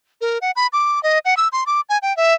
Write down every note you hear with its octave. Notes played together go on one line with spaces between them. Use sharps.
A#4
F#5
B5
D6
D#5
F#5
E6
C6
D6
G#5
G5
E5